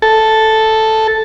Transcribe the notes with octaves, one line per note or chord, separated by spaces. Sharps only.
A4